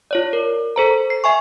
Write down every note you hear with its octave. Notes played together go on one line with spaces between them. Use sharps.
F4 C#5 D5
A#4
A4 C5 A#5
C7
E5 G#5 C#6